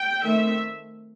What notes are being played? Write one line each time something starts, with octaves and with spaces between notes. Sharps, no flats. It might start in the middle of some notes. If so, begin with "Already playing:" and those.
Already playing: G5
D#3 A3 C4 E5